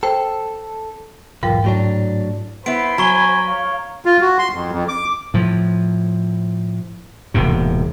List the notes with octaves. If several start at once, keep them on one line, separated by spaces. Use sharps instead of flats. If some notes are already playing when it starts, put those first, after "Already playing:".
A4 C5 G5
B1 E2 G#2 F4 A#4 G5
A2 F#3 D4
B3 E4 C5 B5 C6 D7
F#3 G#5 A#5 C#6 G7
C#5 F5
F4
F#4
C6
F2
F2
D6
A2 F3
E1 D#2 A2 C3